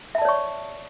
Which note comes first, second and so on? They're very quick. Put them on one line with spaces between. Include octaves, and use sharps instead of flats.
E5 A5 D5 C#5 C#6